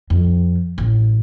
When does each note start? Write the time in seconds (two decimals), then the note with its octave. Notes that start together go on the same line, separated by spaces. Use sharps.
0.10 F2
0.78 A1